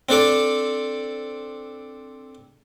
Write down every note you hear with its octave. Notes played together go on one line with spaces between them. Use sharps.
C4 D4 A4 D5